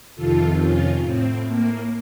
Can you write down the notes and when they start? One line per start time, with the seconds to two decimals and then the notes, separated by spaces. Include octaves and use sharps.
0.16 F2 C3 D#3 F4 A4
0.60 C#4 F4
1.03 A2 C4
1.47 A#3